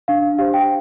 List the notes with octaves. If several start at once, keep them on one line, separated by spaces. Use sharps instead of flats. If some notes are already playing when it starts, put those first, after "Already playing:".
D4 F5
G4 C5 F5
G5